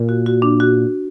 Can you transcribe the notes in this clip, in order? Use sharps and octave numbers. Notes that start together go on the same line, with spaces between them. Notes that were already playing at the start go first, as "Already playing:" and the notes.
Already playing: A#2
F#4
F#4
D4
F#4